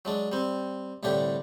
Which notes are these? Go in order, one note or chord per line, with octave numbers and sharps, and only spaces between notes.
F#3 G#3 D4
G3 C4
C2 A2 D3 D4 G4